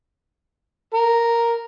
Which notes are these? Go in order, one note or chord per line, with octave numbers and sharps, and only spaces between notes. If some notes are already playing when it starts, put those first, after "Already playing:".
A#4